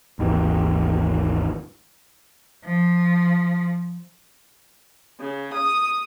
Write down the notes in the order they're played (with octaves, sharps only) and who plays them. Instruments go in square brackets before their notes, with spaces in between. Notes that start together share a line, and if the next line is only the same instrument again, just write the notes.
[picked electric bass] G#1 D#2 D#3 E3
[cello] F3
[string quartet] C#3
D#6